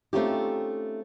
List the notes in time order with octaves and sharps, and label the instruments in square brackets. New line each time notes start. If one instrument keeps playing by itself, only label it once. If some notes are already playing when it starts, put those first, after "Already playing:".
[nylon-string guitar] A3 C4 C#4 D#4 F4 G4